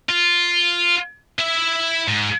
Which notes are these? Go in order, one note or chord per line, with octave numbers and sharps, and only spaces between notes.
F4
E4 E5
G#2